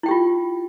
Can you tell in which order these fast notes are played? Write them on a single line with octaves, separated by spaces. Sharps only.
E4 G5 G4 F4